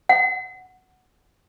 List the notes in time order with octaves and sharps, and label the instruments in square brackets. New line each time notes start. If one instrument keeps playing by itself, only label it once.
[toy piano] F#5